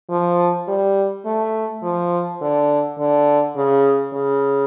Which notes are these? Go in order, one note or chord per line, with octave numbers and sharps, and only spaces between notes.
F3
G3
A3
F3
D3
D3
C#3
C#3